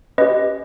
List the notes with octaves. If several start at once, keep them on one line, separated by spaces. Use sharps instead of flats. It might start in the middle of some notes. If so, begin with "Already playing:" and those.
C#4 G4 B4 D#5